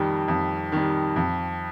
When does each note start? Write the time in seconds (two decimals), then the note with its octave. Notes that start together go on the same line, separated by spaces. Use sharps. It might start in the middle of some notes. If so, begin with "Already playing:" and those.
Already playing: F2 D#3 G3
0.28 F2
0.72 D#3 G3
1.16 F2